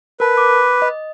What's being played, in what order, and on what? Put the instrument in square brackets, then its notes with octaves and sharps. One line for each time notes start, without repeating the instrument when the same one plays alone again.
[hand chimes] A#4 A5 [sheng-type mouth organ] B4
[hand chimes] D6
D#5